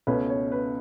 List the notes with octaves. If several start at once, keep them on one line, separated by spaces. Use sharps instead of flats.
C#2 B2 A3 C#4 B4
C#5
B4